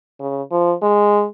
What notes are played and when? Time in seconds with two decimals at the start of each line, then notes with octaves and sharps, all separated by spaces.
0.20 C#3
0.51 F3
0.82 G#3